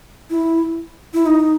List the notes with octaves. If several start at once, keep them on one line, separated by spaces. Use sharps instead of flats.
E4
E4
D#4